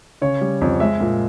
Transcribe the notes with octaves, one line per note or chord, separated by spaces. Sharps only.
C#3 C#5
G3
F2
G#3 E5
A#2